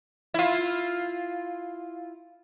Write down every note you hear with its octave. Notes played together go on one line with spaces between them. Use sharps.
E4 F4